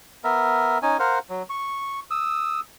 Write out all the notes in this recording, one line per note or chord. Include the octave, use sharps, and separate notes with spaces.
B3 A#4 E5
C#4 D#4 G#5
A#4 C5 F5 F#5
F#3
C#6
D#6 E6